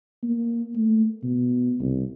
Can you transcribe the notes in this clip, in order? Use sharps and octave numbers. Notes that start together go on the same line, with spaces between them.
A#3
A3
B2
C2